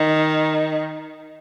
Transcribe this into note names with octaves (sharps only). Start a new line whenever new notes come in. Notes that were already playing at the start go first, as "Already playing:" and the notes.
Already playing: D#3